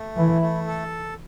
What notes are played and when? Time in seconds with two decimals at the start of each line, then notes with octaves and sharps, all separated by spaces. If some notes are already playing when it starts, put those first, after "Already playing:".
Already playing: A3
0.16 E3 E4
0.42 A3
0.67 A4